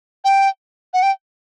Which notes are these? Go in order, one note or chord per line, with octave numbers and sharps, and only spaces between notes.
G5
F#5
G5